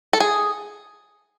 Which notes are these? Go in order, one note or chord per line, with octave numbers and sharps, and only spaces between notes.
A4
G#4